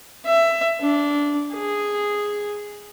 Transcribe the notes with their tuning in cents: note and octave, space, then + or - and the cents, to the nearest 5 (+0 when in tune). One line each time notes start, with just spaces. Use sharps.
E5 +15
D4 -15
G#4 -5